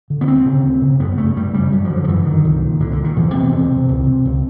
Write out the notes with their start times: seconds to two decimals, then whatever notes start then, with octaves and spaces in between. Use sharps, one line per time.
0.10 D3
0.21 B3
0.28 D2 C4
0.46 C#3
0.64 D2
0.82 C#3
1.00 F#2 B3
1.18 C#3 A3
1.36 F#2 G3
1.54 C#3 G3
1.72 F#2 F#3
1.84 F3
1.90 D3
1.96 F#3
2.04 F3
2.08 F#2 E3
2.26 D3 D#3
2.44 C2
2.62 A#2
2.80 C2 D3
2.92 D3
2.98 A#2
3.04 D#3
3.16 E2 F3
3.34 C3 B3
3.52 E2 C4
3.70 C3
3.88 C#2
4.07 C3
4.25 C#2